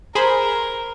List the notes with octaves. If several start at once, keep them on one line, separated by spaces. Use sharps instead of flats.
G#4 A#4 C5 B5